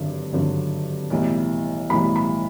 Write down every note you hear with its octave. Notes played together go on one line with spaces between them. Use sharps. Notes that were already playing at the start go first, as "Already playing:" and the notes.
Already playing: G#1 G2 D3 F#3
G#1 G2 D3 F#3
B1 A2 E3 G3
B1 A2 E3 G3 B5
B5